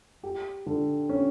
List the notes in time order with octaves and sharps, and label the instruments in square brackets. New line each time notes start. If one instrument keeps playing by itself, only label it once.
[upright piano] G4
D3
C#4